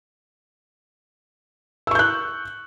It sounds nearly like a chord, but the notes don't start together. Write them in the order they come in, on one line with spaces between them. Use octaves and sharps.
E6 C#6 G6 F#6